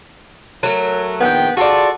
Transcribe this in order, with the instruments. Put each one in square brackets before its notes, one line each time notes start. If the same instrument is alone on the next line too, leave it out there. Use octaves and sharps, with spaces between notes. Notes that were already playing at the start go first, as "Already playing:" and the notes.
[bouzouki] F#3 A3 [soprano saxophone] A#4
[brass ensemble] A#1 D#3 G5 [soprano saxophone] B3
[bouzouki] F4 D5 [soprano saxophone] F#4 [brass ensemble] G#4 A4 A5